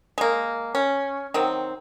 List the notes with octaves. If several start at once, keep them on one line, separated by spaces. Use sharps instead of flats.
G#3 A#3
C#4
D#3 F#3 C4